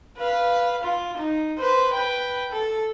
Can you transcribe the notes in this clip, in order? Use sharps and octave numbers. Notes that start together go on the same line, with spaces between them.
B4 F5
F4
D#4
B4 C5
B4 G5
A4